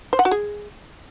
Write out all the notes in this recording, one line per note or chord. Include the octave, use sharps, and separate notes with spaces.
C5
F#5
F#4
G#4